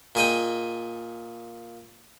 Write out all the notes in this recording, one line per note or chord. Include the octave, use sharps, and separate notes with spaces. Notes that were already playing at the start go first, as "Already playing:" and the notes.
A#2 G#4 D#5 G5